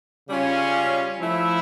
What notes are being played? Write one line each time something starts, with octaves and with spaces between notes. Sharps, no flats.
C#3 G3 C#4 F4
F3 A3 E4